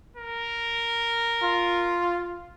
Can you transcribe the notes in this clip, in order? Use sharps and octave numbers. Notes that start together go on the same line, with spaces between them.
A#4
F4